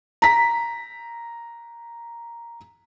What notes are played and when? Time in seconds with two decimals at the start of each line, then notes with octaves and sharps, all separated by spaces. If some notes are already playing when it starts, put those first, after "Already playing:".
0.22 A#5 B6